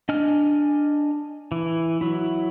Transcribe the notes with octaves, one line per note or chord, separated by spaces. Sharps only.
D4 D#5 G#5 F6
E3
F#3 E4